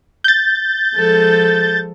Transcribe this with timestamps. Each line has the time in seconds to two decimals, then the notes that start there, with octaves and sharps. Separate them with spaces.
0.24 G6 A6
0.96 F3 G#3 A4